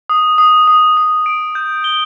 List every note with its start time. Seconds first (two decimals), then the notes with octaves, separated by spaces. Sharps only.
0.10 D#6
0.38 D#6
0.68 D#6
0.97 D#6
1.26 D7
1.55 G6
1.84 G7